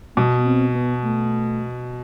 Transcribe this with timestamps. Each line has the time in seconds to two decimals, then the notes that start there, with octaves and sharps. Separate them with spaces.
0.17 B2 B3
0.46 C4
0.75 B3
1.03 A3